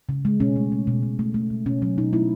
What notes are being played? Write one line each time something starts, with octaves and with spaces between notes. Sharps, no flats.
C#3
G#3
B2 C#4
A3
A3
B2
B2
A3
A3
B2
B2 C#4
F#3 C#4
B2 D#4
A3 E4